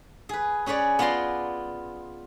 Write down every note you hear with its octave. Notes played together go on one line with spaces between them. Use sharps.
G#4 B4
C#4 G#4 B4 C#5 D5
B3 F4 D5 A#5 C6